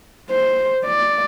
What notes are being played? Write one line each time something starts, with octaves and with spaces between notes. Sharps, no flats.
C5
D5